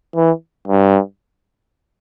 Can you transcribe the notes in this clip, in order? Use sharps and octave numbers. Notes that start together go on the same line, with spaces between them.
E3
G2